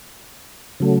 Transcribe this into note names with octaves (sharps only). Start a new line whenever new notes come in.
C#3 F#3 A3